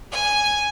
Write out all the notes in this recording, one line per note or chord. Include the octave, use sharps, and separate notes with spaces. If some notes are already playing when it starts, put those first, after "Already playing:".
G#5